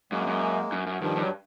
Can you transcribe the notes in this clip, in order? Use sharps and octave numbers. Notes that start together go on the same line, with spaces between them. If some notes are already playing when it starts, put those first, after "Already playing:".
F#2 G#3 A#3
F#2
F#2
F#2
G2 D#3 F3
G2
F#3